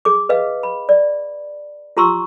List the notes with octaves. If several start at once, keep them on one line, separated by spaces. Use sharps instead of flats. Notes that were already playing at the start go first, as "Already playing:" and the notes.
G#4 D6
B4 D#5 F5
B5
D5
F4 G4 A#5 C6 C#6 E6